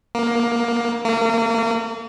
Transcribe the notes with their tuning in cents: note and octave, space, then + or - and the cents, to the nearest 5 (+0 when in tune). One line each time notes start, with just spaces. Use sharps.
A#3 +15
A#3 -35